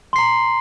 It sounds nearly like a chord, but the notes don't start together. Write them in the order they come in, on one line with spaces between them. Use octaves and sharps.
C6 C7 A#5